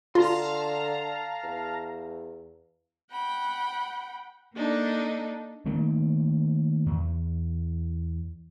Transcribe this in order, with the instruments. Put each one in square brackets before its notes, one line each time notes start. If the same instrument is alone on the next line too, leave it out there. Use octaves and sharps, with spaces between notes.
[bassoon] D3 [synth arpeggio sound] F4 [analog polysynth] F5 A5 A#5 [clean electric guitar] C6
[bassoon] E2
[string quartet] F#5 G5 B5
A#3 D4 D#4 A4
[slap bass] D#3 A3 A#3 C4
E2